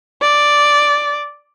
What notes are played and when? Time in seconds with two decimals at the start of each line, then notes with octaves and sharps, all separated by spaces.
0.22 D5